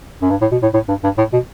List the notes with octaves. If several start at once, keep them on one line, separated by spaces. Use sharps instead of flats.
F#2
G2
A2
B2
A2
A2
G2
G2
A2
B2